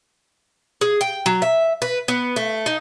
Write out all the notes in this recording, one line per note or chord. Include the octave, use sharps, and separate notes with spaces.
G#4
G5
F#3
E5
B4
B3
A3
D#4